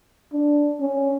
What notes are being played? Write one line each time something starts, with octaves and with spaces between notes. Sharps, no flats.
D4
C#4